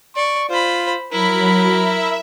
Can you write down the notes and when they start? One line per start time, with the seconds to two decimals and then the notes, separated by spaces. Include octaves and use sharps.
0.16 D5 C#6
0.49 F4 C5 B5
1.12 F#3 E4 A#4 B5
1.70 E5